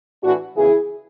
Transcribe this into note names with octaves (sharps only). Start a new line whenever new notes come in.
A2 E3 D4 F#4
E2 C#3 E3 E4 G#4